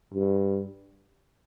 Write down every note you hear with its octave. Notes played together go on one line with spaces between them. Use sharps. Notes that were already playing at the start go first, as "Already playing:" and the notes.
G2